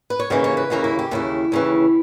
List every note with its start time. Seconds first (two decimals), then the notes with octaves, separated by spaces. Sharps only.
0.10 B4
0.20 C#5
0.30 D#2 C#3 E3 A#3 D#5
0.44 C#5
0.57 B4
0.70 D#2 C#3 E3 A#3 A#4
0.84 E4
0.99 G4
1.11 D#2 C#3 E3 E4
1.52 D#2 C#3 E3